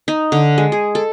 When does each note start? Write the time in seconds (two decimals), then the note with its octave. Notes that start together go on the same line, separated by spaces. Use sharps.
0.08 D#4
0.32 D3
0.58 G#3
0.72 G#4
0.95 A4